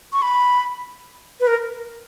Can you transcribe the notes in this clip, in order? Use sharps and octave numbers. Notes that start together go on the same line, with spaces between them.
C#6
B5
B4
A#4